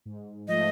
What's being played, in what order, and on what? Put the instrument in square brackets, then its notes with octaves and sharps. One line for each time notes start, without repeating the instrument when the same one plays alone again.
[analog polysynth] G#2
[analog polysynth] F3 A3 [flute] D#5